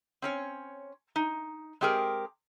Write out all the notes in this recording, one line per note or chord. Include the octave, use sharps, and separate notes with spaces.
C4 C#4 C#5
D#4
G#3 C4 G4 G#4 A#4